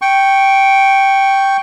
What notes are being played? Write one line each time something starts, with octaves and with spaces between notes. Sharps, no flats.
G5 C#6